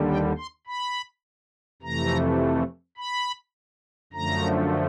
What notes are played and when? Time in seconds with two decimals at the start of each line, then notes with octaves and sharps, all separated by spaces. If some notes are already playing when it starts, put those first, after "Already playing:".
Already playing: D#2 D3 G3
0.09 G5
0.38 C6
0.67 B5
1.82 F2 C3 E3 A3 A#5
2.97 B5
4.13 F#2 D3 F3 A3 A#5